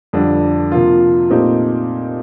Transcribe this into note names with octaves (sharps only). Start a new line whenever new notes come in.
F2 D3 G3 D4
C3 F3 A#3 F4
A#2 A3 C4 D#4 G4